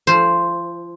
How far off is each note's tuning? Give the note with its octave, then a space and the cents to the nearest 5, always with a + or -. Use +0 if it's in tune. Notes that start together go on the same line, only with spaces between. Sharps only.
F3 -30 C5 +0